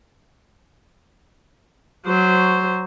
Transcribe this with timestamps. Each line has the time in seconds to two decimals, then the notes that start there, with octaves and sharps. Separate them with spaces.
2.07 F#3 C5